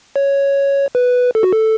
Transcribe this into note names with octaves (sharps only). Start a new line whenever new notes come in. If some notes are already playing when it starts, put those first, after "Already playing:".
C#5
B4
A4
F#4
A4